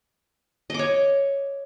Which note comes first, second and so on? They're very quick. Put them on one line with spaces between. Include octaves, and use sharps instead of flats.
D#5 D6 C#5